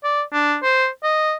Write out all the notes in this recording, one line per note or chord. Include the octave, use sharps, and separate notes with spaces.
D5
D4
C5
D#5